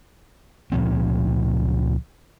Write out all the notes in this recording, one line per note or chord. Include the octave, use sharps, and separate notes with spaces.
C#2 A#2 F3 C4